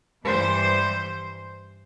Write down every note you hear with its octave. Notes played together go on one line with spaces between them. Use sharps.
G2 E3 G3 C5